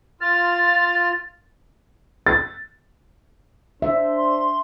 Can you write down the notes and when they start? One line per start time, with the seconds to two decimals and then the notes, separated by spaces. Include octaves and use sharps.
0.21 F4 F6 A6
2.26 A6
3.82 D4 C5 E5
4.17 C6